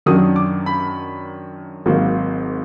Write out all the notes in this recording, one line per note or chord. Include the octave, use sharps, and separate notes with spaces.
F#2 D#3 F#3 D4 D#6
D6
B5
G#1 G#2 F#3 A#3